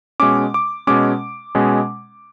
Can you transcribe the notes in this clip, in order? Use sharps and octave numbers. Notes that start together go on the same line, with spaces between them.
B2 G#3 C#4 D6
D6
B2 G#3 C#4 D6
B2 G#3 C#4